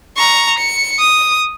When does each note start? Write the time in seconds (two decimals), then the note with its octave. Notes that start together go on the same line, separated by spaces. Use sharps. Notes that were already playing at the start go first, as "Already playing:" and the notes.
0.17 A#5 C#6
0.58 C#7
0.99 D#6